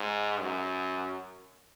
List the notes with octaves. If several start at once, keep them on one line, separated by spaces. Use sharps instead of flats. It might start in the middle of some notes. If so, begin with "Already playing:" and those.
Already playing: G#2
F#2